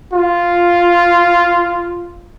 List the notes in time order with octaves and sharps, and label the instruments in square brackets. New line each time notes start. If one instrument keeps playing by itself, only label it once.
[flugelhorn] F4